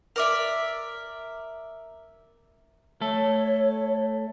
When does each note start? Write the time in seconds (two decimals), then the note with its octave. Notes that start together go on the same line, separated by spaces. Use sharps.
0.16 A#4 D5 E5
3.01 A3 A4 C#5